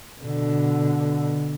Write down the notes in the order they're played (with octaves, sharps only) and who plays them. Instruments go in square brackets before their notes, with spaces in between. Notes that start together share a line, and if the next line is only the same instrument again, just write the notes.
[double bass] B2 D3